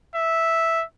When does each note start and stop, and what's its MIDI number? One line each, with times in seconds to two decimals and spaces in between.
0.16 0.85 76